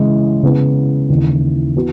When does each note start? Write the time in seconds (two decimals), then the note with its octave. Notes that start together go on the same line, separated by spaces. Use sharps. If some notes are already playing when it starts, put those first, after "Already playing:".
Already playing: C#3 E3 G#3
0.43 C#3 E3 B3
1.10 D#2 C#3 E3
1.76 E3 B3 F#4